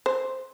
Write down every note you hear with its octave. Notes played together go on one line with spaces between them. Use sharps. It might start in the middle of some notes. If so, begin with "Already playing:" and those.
C5